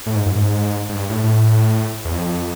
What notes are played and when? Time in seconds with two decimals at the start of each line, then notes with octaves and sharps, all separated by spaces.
0.07 A2
0.15 G#2
0.26 F#2
0.36 G#2
0.89 G#2
0.94 G2
1.10 A2
1.24 A2
2.05 E2
2.13 F2